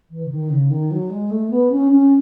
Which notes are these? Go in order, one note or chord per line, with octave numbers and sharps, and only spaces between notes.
E3
C#3
D#3
C#3
D#3
F#3
G#3
A3
B3
C#4
C#4